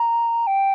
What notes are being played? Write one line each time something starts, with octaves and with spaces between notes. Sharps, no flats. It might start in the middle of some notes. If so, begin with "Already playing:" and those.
Already playing: A#5
G5